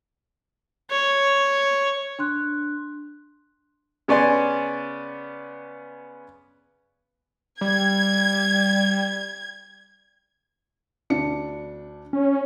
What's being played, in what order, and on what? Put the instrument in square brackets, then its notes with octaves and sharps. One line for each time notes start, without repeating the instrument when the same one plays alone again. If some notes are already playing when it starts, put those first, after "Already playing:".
[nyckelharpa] C#5
[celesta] D4 C6 F#6
[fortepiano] C#3 B3 C#4 D5 G#5 C6
[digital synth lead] G3 [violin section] G#6
[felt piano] D2 D4 C#7
[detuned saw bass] C#4